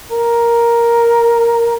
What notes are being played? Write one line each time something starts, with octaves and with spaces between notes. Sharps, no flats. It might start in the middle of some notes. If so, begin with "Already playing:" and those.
A#4